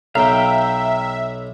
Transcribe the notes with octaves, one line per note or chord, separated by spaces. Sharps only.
B1 E5 F5 G5 A#5